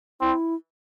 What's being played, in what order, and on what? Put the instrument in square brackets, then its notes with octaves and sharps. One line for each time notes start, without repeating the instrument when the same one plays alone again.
[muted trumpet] C4 [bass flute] E4